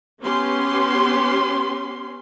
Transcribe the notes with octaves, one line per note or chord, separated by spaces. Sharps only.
B3 C#4 G4 C6